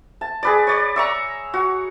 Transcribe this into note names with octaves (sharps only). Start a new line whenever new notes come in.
A5
G#4 B4 D5
C#5 D5
A#5 C#6 E6
F#4